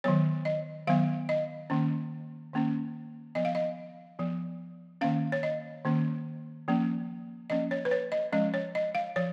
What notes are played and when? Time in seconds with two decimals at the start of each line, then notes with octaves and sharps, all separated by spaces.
0.04 D#3 F#3 B3 C#5
0.45 D#5
0.87 D#3 F#3 B3 F5
1.29 D#5
1.70 D#3 A#3 C#4
2.53 D#3 A#3 C#4
3.35 F3 B3 D#5
3.45 F5
3.55 D#5
4.19 F3 B3
5.01 D#3 A#3 C#4 F5
5.32 C#5
5.43 D#5
5.85 D#3 A#3 C#4
6.68 F3 A#3 C#4
7.50 F3 A#3 C#4 D#5
7.71 C#5
7.85 B4
7.91 C#5
8.12 D#5
8.32 F3 G#3 C#4 D#5
8.54 C#5
8.75 D#5
8.95 F5
9.16 F3 C#5